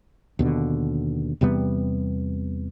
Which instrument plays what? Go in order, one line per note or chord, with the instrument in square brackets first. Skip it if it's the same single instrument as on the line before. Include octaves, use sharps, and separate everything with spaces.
[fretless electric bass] D#2 B2 D3
E2 C3 G3 B3